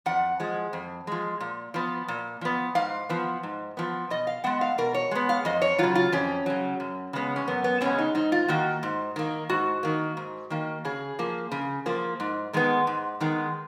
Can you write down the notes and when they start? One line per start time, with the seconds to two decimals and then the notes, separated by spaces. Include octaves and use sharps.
0.06 F2 F#5
0.40 F3 G#3
0.73 F2
1.07 F3 G#3
1.40 A#2
1.74 F3 B3
2.08 A#2
2.41 F3 B3
2.75 G#2 F5
3.09 F3 B3
3.43 G#2
3.77 F3 B3
4.10 B2 D#5
4.27 F5
4.44 G#3 B3 F#5
4.61 F5
4.78 B2 A#4
4.95 C#5
5.11 G#3 B3
5.29 F5
5.45 F2 D#5
5.62 C#5
5.78 C#3 F#3 F4
5.95 F4
6.12 F2 C#4
6.46 C#3 F#3
6.80 F#2
7.13 C#3 G#3 B3
7.36 C#4
7.48 F#2 B3
7.64 B3
7.81 C#3 G#3 B3 C#4
7.99 D#4
8.15 G#2 D#4
8.32 F4
8.48 D#3 A#3 F#4
8.83 G#2
9.16 D#3 A#3
9.50 G#2 F#4
9.83 D#3 A#3
10.17 G#2
10.50 D#3 A#3
10.85 C#3 G#4
11.19 F3 A#3
11.52 C#3
11.86 F3 A#3
12.20 G#2
12.53 D#3 G#3 B3
12.87 G#2
13.21 D#3 G#3 B3